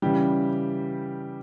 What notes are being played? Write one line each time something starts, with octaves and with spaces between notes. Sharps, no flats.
C#3 E3 G3 G4